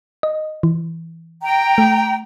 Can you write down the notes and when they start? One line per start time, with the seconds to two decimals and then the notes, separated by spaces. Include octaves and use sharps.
0.23 D#5
0.63 E3
1.43 G5 A#5
1.78 A3